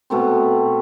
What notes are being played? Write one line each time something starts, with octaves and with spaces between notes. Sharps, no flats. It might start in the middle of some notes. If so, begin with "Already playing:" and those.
B2 A3 C4